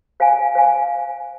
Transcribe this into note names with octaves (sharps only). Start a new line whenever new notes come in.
C5 F5 G#5
C5 F5 G#5